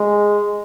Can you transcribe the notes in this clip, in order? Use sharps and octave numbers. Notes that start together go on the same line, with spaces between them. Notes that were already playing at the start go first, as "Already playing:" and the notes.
Already playing: G#3